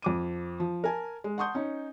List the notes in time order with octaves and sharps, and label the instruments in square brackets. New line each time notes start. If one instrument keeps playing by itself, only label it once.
[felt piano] F2 D6 D#7
F3
A#4 G#5 A5
G#3
F#5 A5 C6 C#6 D#6 G6
C#4 D#4